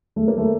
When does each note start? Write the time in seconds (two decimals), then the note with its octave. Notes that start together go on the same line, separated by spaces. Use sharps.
0.16 A3
0.28 A#3
0.38 A3